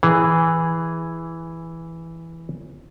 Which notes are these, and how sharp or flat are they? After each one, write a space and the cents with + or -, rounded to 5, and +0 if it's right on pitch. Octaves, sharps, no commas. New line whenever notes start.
E3 +0 G#4 +0